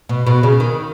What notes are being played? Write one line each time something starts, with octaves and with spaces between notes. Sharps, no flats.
B2
B2
C#3
D#3